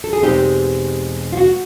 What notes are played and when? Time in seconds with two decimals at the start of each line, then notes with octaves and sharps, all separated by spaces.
0.04 A4
0.13 G#4
0.23 E2 B2 G#3 C4 D#4 G4
1.32 F4
1.37 F#4